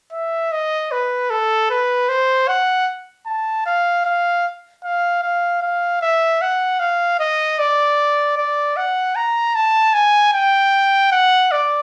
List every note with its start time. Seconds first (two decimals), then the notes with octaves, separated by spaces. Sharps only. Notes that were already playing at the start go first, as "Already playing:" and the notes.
0.12 E5
0.52 D#5
0.92 B4
1.30 A4
1.70 B4
2.09 C5
2.48 F#5
3.26 A5
3.66 F5
4.05 F5
4.84 F5
5.23 F5
5.62 F5
6.02 E5
6.42 F#5
6.80 F5
7.20 D#5
7.59 D5
8.37 D5
8.77 F#5
9.16 A#5
9.55 A5
9.94 G#5
10.33 G5
11.12 F#5
11.52 D5